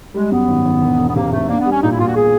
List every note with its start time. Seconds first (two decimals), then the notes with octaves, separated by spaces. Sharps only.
0.14 G3 G#3
0.31 F#2 B3
0.48 G#1
0.65 G#1
0.81 E1
0.98 E1
1.08 B3
1.15 C3 A#3
1.32 C3 A3
1.49 A#3 D4
1.60 B3
1.66 G3
1.71 C#4
1.82 A#2 D#4
1.91 E4
1.99 A#2 F4
2.07 F#4
2.16 G#4